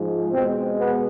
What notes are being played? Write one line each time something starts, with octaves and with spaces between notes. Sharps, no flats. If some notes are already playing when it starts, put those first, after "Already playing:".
Already playing: G#2 F3 G#3
B2 G#3 C4
B3